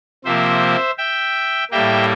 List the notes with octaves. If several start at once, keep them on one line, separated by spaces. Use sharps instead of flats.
C3 F3 A#3 C5 E5
E5 G5
A2 G3 A#3 E5 G5